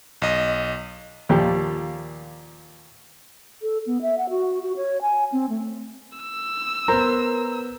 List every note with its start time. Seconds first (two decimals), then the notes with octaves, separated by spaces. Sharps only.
0.22 B1 D#5
1.29 D#2 A#2 F3 G4
3.62 A4
3.87 B3
4.02 E5
4.18 F#5
4.30 F#4
4.63 F#4
4.77 C#5
5.02 G#5
5.32 C4
5.49 A3
6.18 E6
6.88 B3 A#4 C5 A#5